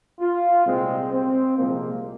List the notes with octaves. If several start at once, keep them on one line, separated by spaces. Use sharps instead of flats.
F4
C2 A#2 G#3 C4
C4
C2 A#2 F3 G#3 A#3